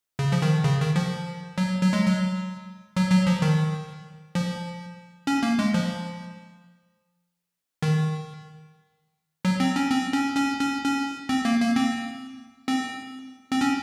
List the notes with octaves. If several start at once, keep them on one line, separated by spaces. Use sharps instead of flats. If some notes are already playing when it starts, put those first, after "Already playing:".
C#3
F3
D#3
C#3
D#3
F3
F#3
F#3
G#3
F#3
F#3
F#3
F3
D#3
F3
C#4
A#3
G#3
F3
D#3
F#3
C4
C#4
C4
C#4
C#4
C#4
C#4
C4
A#3
A#3
C4
C4
C4
C#4